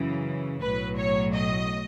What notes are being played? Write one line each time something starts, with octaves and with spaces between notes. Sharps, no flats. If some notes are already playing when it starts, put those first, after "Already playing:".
Already playing: F#2 C#3 E3
B1 A2 F#3 B4
C#5
D#5